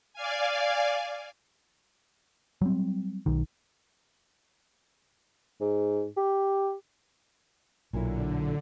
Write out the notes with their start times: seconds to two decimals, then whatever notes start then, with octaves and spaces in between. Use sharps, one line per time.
0.14 D5 F5 G#5
2.62 F#3 G3 C4
3.26 B1 D#3
5.61 G#2
6.17 G4
7.93 B1 A#2 D3 F#3 E4